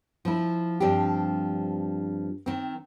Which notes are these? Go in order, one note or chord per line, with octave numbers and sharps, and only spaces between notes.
F3 E4
G2 F3 C4 D4 G4
D#3 C4